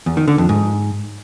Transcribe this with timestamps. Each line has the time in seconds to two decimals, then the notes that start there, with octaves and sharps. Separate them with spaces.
0.06 E2
0.17 D#3
0.28 D3
0.38 F2
0.49 G#2